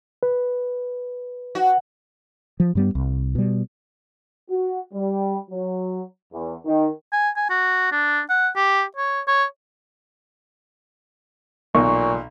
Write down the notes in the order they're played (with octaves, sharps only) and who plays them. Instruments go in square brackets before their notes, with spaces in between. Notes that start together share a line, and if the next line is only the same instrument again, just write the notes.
[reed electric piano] B4
[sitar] F#4
[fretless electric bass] F3
G2 G3 B3
C2
B2 G3
[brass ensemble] F#4
G3
F#3
E2
D#3
[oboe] G#5
G#5
F#4
D4
F#5
G4
C#5
C#5
[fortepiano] B1 [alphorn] A#2 [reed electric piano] C#6